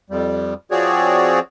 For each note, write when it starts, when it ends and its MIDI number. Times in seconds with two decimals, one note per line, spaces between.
0.10 0.54 41
0.10 0.54 55
0.71 1.40 53
0.71 1.40 60
0.71 1.40 66
0.71 1.40 68
0.71 1.40 73
0.71 1.40 74